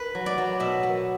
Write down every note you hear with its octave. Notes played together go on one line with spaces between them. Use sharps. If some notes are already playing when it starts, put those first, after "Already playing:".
Already playing: B4
F#3
D5
F#3
B2 E5
B3